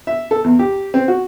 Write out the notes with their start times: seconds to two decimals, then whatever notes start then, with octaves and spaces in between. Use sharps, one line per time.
0.07 E5
0.31 A4
0.44 E2
0.59 G4
0.94 C4
1.08 F#4